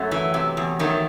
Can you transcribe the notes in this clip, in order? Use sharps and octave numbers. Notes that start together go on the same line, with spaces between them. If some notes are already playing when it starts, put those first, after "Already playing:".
Already playing: F#2 F#3 A3
E3
C3
E2
D#3 F#3 A3